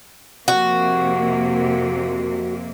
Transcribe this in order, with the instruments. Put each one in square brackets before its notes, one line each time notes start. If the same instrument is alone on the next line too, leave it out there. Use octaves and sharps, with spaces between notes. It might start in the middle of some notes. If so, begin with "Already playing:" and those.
[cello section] F2 C3 A#3 [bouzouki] F#4